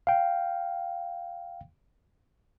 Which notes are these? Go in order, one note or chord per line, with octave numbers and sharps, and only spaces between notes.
F5 G5